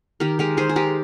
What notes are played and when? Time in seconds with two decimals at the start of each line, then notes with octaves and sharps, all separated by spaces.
0.20 D#3 G4 A#4
0.39 G#3 G4 A#4
0.57 D#3 G#4 C5
0.69 G#4
0.76 G#3 G4 A#4